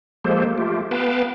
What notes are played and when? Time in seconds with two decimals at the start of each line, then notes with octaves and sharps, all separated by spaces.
0.24 F3 G#3 A#3 G4 A4 C5
0.45 A#3
0.58 A3 F4 G4
0.91 B3 B4 F5 G5 A5